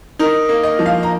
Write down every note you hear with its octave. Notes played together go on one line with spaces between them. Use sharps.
D#4 A#4
A#3
D#5
F3
F5
A#5